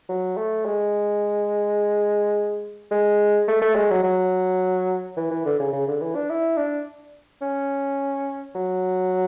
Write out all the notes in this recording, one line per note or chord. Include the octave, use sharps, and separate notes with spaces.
F#3
A3
G#3
G#3
A3
A3
G#3
F#3
F#3
E3
E3
D3
C#3
C#3
D3
E3
D4
E4
D4
C#4
F#3